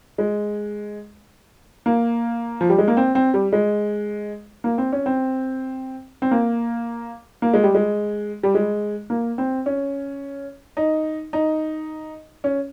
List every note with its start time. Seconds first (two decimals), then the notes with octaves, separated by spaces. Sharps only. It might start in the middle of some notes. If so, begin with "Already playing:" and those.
0.18 G#3
1.86 A#3
2.61 F3
2.69 G3
2.78 G#3
2.88 A#3
2.97 C4
3.15 C4
3.34 G3
3.53 G#3
4.64 A#3
4.78 C4
4.92 C#4
5.06 C4
6.22 C4
6.31 A#3
7.42 A#3
7.54 G#3
7.64 G3
7.75 G#3
8.43 G3
8.55 G#3
9.10 A#3
9.38 C4
9.66 C#4
10.77 D#4
11.33 D#4
12.44 C#4